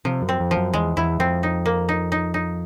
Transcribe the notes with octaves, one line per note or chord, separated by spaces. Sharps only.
C3 F3
F#2
C4
F2
F3
F#2
E2 G#3
E2 E4
F2 C4
D#4
A#3
D#4
D#4
D#4